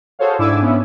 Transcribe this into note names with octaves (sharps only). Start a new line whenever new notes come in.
F#4 G#4 A4 C5 C#5 F5
G#2 D4 E4 G#5 D6 E6
B3 C#4 E4